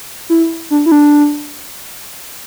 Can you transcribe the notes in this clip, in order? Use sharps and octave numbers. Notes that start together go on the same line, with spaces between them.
E4
D4
E4
D4